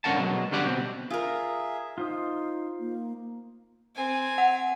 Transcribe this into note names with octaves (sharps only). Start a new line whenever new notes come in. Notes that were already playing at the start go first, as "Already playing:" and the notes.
G2 D3 C#4 A#4 F#5 A5
B2 F#3 G#3
D3 G3 C#4 G4 D5 F#5
B2 C4
F4 G#4 A#4 E5
D#4 F4 C5 D#6
A#3
C4 G#5
F#5